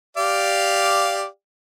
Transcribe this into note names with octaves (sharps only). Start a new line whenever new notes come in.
G4 D5 F5